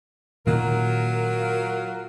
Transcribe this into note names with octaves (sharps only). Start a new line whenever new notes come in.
A#2 D#3 F#3 A#3 F4 A#4